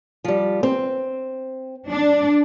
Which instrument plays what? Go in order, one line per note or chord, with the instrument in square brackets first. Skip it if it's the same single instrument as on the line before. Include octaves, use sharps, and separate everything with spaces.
[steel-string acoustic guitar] F3 G3
C4
[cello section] D4